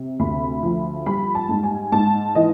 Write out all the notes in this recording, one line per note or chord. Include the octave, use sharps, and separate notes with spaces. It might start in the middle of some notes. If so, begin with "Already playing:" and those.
Already playing: C3
D2 B5
F3
G3 B5
A5
G#2
G#5
G#2 A5
E3 D#5